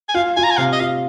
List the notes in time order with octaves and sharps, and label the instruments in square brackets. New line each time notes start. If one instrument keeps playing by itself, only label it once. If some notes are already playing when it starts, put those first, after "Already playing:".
[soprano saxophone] G#5
[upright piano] F4 [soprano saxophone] F5
[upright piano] F4 [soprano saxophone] G#5
[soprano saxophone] A#5
G#5
[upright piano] C3 [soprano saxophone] F5
[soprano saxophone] D#5
[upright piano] F4 [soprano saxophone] F5